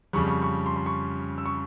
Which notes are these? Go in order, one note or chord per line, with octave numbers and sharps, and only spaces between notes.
F2 C#3 G3 C#6
C#6
C#6
C6
C6
C#6
E6
C#6